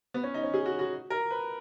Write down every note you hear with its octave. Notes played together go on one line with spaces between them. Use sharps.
B3
C#4
D#4
C#4
G#4
F#4
F#4
A#4
B4